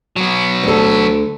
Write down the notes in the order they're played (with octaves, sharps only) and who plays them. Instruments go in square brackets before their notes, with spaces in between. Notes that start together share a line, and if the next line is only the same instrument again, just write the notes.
[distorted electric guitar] F#3 B3
[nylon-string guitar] D2 A4